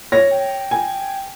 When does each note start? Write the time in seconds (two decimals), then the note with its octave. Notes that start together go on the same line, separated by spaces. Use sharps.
0.12 C#5 A#6
0.31 G5
0.71 G#5